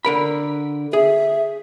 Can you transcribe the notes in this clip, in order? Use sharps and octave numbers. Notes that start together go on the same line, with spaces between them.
D3 A#4 B5
G#4 E5